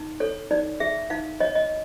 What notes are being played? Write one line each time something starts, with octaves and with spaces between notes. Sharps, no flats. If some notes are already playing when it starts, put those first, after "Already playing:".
Already playing: D#4
A4 C#5
D#4 D5
G#4 E5
D#4 F5
C#5 D#5
D#5